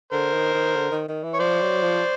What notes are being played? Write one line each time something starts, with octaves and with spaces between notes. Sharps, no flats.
D3 A#4 C5
D#3
D#3
D3
D#3
D#3
E3
C#5
F3 C5 D5
F#3
F3